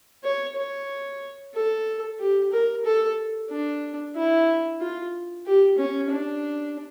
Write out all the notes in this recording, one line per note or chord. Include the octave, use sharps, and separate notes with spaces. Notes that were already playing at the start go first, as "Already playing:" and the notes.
C#5
C#5
A4
G4
A#4
A4
D4
E4
F4
G4
C#4
D4